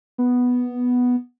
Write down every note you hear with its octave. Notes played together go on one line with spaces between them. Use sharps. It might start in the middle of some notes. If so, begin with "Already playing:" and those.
B3